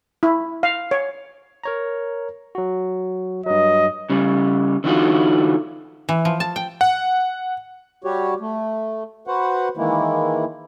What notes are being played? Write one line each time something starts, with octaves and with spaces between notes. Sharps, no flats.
E4
F5
C#5
A#4 C#5 A#5
F#3 F#4
G2 F#3 D#5
C#3 G3
D3 E3 F#3 D#4 F4 F#4
E3
F3
A5
G5
F#5
G3 F#4 G4 C#5
A3
F#4 B4 C5 F#5
D#3 E3 G#3 A#3 E4